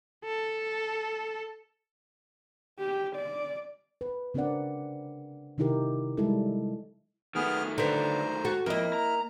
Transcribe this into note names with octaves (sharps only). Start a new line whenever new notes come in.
A4
G4
D5
B4
C#3 C4 D4 A#4 D5 F#5
C3 D#3 D#4 E4 G4 A#4
G3 G#3 E4 A4
D#3 A3 B3 G#4 F6
D3 B4 C5 A#5
F#4 A4
F2 A#3 E4 D#5 F6
A#5